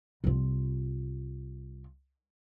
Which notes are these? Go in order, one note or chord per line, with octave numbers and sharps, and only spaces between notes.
C2 F4